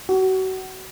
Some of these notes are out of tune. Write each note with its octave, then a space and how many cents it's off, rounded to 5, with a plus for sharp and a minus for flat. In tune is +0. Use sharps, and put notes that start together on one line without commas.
F#4 +30